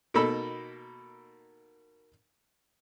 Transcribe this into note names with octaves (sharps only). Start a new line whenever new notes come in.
B2 A#3 D#4 A4 B5 E6